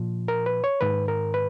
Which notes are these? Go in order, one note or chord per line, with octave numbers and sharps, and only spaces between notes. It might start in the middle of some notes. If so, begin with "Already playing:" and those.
Already playing: A#2 F3
A#4
B4
C#5
G#2 D#3 B4
A#4
B4